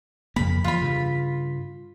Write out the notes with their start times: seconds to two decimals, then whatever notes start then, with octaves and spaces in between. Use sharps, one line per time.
0.36 F2 C#3 A#3 B5
0.64 E3 F3 F4 B5
0.82 G2 C#3